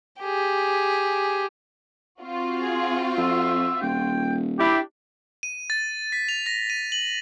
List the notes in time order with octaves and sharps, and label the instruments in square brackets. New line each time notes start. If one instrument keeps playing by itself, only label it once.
[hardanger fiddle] G4 G#4
[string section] C4 F4 F#4
[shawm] G#4
[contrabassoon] F2 [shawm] E5
[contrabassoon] D#1 [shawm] G5
[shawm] D4 [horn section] E4 G4
[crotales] D#7
A6
B6
F7
A#6
D#7
F#7